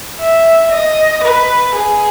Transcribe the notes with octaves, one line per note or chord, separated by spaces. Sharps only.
E5
D#5
B4
G#4